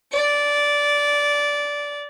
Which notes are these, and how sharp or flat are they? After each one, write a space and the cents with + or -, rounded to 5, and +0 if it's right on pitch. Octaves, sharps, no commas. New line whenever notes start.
D5 -15